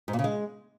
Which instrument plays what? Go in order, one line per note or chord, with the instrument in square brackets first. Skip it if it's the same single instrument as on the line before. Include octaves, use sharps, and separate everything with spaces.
[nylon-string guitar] G#2
A#2
C#3
G#3